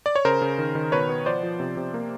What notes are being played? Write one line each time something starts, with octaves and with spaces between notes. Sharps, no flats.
D5
C#5
C#3 A#4 C5
C#3
D#3
D#3
B2 B4 C#5
B3
F3 C5 D5
F3
C3
C3
A#3